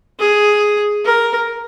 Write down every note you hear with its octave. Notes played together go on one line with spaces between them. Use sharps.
G#4
A#4